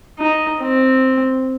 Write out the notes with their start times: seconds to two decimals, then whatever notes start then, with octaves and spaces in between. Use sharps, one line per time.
0.19 D#4
0.60 C4